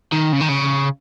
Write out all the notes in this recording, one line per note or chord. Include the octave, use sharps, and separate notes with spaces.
D#3
C#3
D#3
C#3